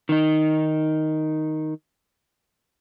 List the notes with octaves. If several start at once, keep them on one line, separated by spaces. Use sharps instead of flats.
D#3 D#4